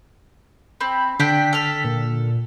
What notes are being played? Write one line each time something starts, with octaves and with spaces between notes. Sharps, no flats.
C4 B5
D3 C4 D4 G5 B6
A4 F6
A#2